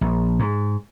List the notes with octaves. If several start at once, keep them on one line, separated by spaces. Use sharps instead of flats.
A#1
G#2